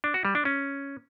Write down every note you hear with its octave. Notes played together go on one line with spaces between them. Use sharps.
D4
F#4
G3
D4
C#4